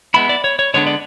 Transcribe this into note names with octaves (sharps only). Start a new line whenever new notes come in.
G#3 B3 E4 B5
D5
C#5
C#5
D3 G#3 B3 D4 C#5
D5